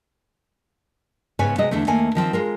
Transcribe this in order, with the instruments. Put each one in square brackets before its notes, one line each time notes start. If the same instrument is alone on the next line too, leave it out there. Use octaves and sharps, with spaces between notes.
[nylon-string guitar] G#2 C#3 B3 B4 C#5 G#5
C3 G#3 F#4 D#5
E2 D3 E3 A3
D#2 A3 A#3 G#5
D#3 F3 C4
G#3 F4 A#4